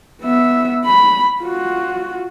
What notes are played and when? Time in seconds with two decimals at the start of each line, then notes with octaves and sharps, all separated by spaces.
0.22 B3 E5
0.85 B5
1.42 F4 F#4